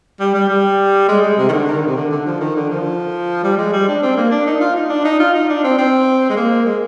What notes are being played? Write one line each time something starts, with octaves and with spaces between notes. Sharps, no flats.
G3
G3
G3
G#3
G#3
C3
D#3
D3
D#3
C3
D3
D3
F3
D#3
D3
F3
G3
G#3
G3
D4
C4
A#3
D4
D#4
F4
D#4
D4
D#4
F4
D#4
D4
C4
C4
G#3
A#3
G#3